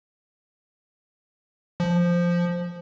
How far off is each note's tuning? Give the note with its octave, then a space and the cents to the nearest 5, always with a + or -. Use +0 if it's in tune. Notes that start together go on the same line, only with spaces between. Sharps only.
F3 -5